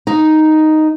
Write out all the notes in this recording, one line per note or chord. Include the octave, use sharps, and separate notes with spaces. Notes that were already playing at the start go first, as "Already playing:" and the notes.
D#4